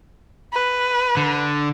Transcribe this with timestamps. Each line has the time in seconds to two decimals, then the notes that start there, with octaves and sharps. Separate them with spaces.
0.53 B4
1.17 D3